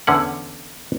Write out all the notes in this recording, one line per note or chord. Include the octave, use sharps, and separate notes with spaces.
E2 D3 C#4 F#5